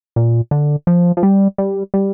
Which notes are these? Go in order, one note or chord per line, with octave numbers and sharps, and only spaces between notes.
A#2
D3
F3
F3
G3
G3
G3